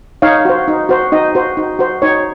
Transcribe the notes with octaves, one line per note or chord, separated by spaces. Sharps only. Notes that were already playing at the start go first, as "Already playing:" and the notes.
D#4 C#5 F5
F#4 C5
D#4
F#4 C5
D#4 D#5
F#4 C5
D#4
F#4 C5
D#4 C#5